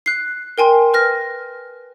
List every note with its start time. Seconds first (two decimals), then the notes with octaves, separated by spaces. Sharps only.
0.06 F#6 C7
0.58 A#4 G5 G#5 C6
0.94 B4 F6 A#6